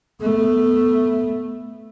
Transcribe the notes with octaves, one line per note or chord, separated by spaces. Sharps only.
A3 B3